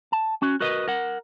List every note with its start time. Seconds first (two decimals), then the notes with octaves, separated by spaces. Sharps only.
0.12 A5
0.42 C#4 F#4
0.60 F#4 A#4 B4 D#5
0.88 A#4 F#5